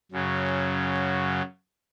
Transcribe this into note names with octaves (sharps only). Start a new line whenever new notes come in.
F#2 C#3 F#3